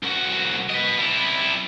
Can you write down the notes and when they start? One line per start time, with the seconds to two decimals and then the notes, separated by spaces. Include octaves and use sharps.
0.03 C2 F#4
0.70 B4 D#5
0.98 G3 E4